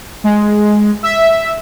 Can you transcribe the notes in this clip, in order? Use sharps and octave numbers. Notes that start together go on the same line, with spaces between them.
G#3
E5